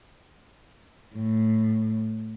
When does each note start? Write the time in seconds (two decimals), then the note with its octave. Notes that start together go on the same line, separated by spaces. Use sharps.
1.16 A2